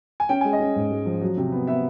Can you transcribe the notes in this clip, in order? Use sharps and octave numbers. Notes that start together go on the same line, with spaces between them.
G#5
C#4 G5
G#3 G#5
D#5
C#4
G#2
G#3
F3
F#3
C3
B3
B3 E5